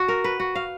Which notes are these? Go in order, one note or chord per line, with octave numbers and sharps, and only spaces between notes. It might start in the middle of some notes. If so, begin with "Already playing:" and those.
Already playing: F#4
A#4
B4
F#4
F5